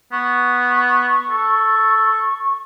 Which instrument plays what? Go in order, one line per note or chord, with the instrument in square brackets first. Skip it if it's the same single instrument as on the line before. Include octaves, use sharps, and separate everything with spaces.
[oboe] B3 [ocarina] C#6
[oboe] A4